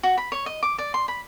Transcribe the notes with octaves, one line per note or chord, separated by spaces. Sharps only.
F#4
B5
C#5
D#5
D6
D5
C6
B5